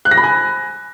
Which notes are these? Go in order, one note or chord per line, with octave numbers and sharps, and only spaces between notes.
F#6
A#6
B5
G#5